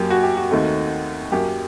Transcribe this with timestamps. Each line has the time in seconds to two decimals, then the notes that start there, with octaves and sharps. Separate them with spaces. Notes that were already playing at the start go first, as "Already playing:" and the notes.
Already playing: F#2 F#3 A#3 G4
0.10 F#4
0.23 G4
0.37 F#4
0.51 D#2 D#3 A3 C4
1.32 F#2 F#3 A#3 G4